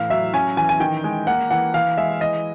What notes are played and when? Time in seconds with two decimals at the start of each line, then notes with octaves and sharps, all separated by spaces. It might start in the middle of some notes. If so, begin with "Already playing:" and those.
Already playing: A2 E3 F5
0.10 F#3 E5
0.33 C#4 G#5
0.57 E3 G#5
0.69 G#5
0.80 D#3 G5
1.04 G#3
1.27 A#3 F#5
1.51 E3 F#5
1.74 E3 F5
1.98 G#3 E5
2.21 E3 D#5